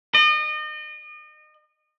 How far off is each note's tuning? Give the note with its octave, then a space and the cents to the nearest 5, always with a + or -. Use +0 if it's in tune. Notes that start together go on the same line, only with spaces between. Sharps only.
D#5 -35